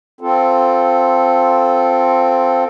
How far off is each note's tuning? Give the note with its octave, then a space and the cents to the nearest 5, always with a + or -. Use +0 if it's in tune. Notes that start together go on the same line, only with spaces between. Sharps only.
C4 +0 F4 +0 A4 +0